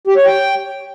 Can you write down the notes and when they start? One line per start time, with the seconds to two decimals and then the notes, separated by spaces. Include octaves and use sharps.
0.07 G4
0.17 C#5
0.26 G5